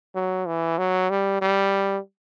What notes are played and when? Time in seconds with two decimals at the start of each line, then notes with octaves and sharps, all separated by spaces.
0.15 F#3
0.47 E3
0.78 F#3
1.10 G3
1.42 G3